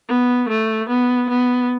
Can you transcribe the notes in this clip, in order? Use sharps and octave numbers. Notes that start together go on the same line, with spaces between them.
B3
A3
B3
B3